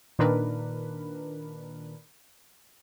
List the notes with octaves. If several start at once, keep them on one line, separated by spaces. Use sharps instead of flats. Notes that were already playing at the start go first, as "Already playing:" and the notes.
A#2 D#3 D4 A#4 B4